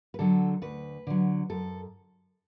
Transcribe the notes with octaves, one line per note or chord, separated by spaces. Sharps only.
B4
D3 F#3 A4
D2 B4
D3 F#3
F#2 A4